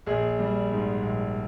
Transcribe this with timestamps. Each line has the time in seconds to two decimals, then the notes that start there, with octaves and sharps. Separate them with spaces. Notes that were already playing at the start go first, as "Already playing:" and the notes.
0.07 A#1 G#4
0.39 G3
0.71 G#2
1.03 A#1